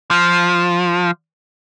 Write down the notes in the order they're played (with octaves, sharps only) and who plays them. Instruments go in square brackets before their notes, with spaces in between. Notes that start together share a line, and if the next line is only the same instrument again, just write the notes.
[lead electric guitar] F3